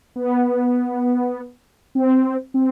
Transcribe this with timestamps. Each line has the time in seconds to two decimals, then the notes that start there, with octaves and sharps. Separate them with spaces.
0.16 B3
1.95 C4
2.54 C4